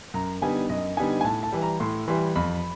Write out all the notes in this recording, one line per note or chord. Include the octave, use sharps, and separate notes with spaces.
F#2 A#5
D3 G3 B3 D#4 G#5
F#2 D#5
D3 G3 B3 D#4 G#5
G#5
A2 A5
A5
E3 G3
A#5
A2 C6
E3 G3 C6
F2 B5